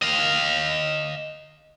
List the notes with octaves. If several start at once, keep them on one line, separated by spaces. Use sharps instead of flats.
D#5 F5